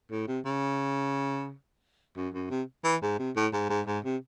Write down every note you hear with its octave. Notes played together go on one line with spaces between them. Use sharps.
A2
C3
C#3
F#2
F#2
C3
E3
G#2
C3
A2
G#2
G#2
G#2
C3